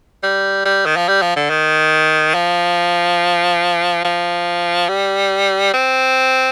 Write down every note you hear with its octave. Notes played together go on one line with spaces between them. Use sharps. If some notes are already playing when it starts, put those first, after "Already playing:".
G3
G3
D#3
F3
G3
F3
D3
D#3
F3
F3
G3
C4